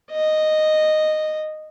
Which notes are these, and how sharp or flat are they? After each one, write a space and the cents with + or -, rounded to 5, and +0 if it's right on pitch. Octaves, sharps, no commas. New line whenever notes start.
D#5 -10